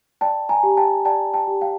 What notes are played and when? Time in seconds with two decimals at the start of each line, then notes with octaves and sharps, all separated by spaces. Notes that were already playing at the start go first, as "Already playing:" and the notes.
0.21 D5 G5 A5
0.49 G#5 A#5
0.63 G4
0.77 G5 A5
1.05 D5 G5 A5
1.34 G5 A5
1.48 G4
1.61 F5 G5